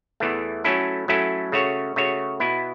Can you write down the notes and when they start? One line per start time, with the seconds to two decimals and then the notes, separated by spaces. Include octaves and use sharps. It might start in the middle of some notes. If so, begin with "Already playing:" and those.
0.20 E2 E3 A3
0.64 F#3 A3 C#4 E4 A4
1.08 F#3 A3 C#4 E4 A4
1.52 C#3 A3 F#4 C#5
1.96 C#3 A3 F#4 C#5
2.40 B2 B3 E4